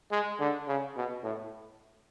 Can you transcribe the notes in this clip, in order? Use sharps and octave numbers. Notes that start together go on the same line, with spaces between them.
G#3
D3
C#3
B2
A2